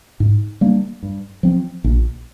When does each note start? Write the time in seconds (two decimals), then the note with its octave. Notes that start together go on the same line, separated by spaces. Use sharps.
0.20 G#2
0.61 G3 A#3 D4
1.03 G2
1.43 F3 C4
1.84 A#1